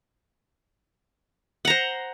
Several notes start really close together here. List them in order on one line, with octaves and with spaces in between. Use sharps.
F#5 A#5 C5